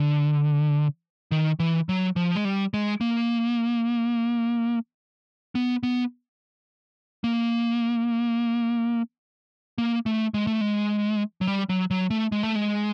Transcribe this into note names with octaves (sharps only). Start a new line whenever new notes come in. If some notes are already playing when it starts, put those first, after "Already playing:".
Already playing: D3
D#3
E3
F#3
F3
G#3
G3
G#3
A#3
B3
B3
A#3
A#3
A3
G#3
A3
G#3
F#3
G3
F#3
F#3
A3
G#3
A3
G#3